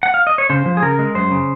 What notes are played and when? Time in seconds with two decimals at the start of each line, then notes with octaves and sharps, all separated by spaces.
0.03 F#5
0.14 F5
0.27 D#5
0.38 C#5
0.50 C#3 C5
0.66 F3
0.77 G#4
0.82 C#3 A#4
0.99 G#3
1.15 F#2 C5
1.31 C#3